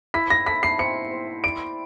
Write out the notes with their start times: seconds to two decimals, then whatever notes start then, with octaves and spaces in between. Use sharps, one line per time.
0.14 E4 B6
0.30 A#6
0.46 A4 B6
0.63 C7
0.78 C4 C#7
1.11 C4
1.43 D5 D7